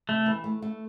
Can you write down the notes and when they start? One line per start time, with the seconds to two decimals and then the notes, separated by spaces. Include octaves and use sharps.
0.09 C3 A3
0.26 E3
0.44 A3
0.62 A3